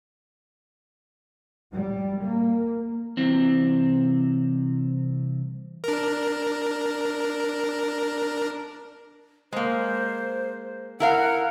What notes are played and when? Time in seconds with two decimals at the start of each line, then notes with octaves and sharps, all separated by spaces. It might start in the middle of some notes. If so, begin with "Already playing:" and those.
1.73 G3
2.22 A#3
3.17 C2 C3 E3 C4
5.84 D4 A#4
9.52 G#3 A#3 C5
11.00 E4 A#4 F5 F#5